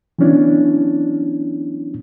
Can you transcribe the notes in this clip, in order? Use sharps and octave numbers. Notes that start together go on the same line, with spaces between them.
E3 F#3 B3 C#4 D4 E4